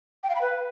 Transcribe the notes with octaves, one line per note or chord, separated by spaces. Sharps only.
G5
F5
B5
B4